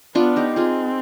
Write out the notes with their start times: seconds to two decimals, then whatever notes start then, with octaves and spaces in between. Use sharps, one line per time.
0.15 B3 D4 F4
0.36 D#4 G4
0.56 C4 F4 G#4